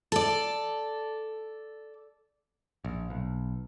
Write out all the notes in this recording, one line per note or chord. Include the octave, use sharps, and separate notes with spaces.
A4 D5
A#1
B1